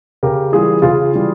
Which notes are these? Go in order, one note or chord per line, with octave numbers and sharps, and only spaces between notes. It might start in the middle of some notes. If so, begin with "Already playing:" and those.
C#3 G4 A#4
E3 G3 F4 G#4
C#3 F4 G#4
E3 G3